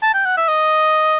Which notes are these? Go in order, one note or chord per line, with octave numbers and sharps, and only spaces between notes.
A5
G5
F#5
E5
D#5